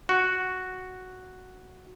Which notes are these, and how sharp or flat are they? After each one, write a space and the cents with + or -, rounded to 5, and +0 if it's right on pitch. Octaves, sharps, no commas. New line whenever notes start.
F#4 +0